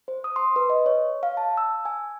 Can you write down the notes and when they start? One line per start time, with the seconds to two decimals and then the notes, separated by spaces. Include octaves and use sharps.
0.08 C5
0.24 D#6
0.36 C6
0.56 B4
0.70 D#5
0.86 C#5
1.23 F5
1.37 A5
1.57 E6
1.85 G#5